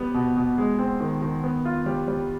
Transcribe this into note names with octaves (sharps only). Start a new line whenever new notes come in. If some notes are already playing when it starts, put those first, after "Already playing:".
Already playing: G3 B3
B2
B2
G#3
C4
D#3
D#3
B3
F4
G3
G3